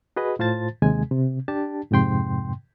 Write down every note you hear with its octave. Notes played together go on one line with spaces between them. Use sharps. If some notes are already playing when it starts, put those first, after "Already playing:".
F#4 G#4 B4 D#5
A2 F4 C5 A5 A6
D#2 C3 G#3 G#5
C3
D4 G4 A5
F2 G#2 C3 G5 C6